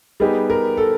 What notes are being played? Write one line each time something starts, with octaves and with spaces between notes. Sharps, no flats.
G3 B3 D#4 G4 G#4
A#4
A4